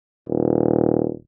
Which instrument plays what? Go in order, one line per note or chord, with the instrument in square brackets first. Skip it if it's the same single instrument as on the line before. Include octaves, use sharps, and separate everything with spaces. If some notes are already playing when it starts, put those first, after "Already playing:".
[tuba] D#1